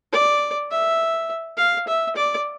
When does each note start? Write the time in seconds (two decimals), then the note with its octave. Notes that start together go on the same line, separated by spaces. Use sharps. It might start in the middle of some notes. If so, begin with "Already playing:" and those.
0.12 D5
0.70 E5
1.57 F5
1.87 E5
2.16 D5